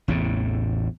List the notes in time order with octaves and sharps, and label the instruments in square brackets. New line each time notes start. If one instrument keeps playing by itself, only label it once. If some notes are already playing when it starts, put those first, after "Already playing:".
[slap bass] A1 E2 A2 C3